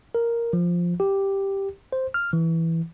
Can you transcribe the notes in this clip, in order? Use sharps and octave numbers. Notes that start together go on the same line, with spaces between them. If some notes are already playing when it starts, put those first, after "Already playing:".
A#4
F3
G4
C5
F6
E3